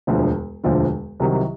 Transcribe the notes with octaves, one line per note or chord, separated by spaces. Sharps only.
E1 D2 D3 F3
E1 D2 D3 F3
C2 C3 D#3 F#3